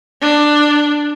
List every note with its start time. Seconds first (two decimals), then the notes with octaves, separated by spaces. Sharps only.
0.22 D4